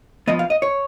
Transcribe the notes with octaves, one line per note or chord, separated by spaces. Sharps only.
F3 B3 D#5
F5
D#5
C#5